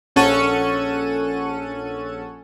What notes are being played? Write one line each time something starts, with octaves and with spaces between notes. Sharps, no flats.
A#1 C#4 A4 F#5 C#6 D#7